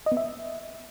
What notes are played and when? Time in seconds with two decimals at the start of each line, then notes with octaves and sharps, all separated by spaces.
0.06 D#5
0.12 B3
0.17 E5